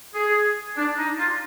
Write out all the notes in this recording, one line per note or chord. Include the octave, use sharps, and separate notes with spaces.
G#4
D4
D#4
F4